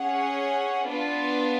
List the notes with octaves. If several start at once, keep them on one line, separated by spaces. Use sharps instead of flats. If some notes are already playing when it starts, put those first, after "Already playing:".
Already playing: C#4 G#4 C#5 F#5
B3 D4 F4 B4